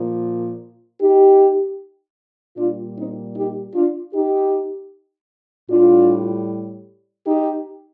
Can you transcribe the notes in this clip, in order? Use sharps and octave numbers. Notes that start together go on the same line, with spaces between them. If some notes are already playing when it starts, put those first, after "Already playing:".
Already playing: A#2 F3
D#4 G4
A#2 G3 D4 F4
C4 D#4
D#4 G4
D4 F4
D#4 G4
A2 G3 D4 F4
D#4 G4